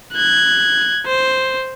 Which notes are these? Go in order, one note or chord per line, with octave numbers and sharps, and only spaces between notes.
F#6 G#6
C5